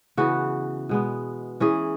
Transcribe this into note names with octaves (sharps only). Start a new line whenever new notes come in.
C#3 E3 B3 F#4
B2 G#3 B3
E3 C#4 G#4